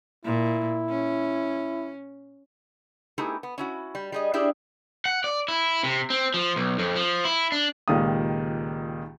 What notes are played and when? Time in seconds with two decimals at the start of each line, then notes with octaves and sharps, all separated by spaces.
0.25 A#2 E4
0.90 C#4
3.18 A3 B3 D#4 E4 G4 G#4
3.43 B3
3.58 C#4 E4 F#4
3.95 G3
4.12 G3 G#4 D#5
4.34 D4 E4 G4 G#4 D5 E5
5.05 F#5
5.24 D5
5.48 E4
5.84 C3
6.10 C4
6.34 F3
6.56 B1
6.79 F2
6.96 F3
7.25 E4
7.52 D4
7.88 C#2 A#2 D#3 G4 F5 D#6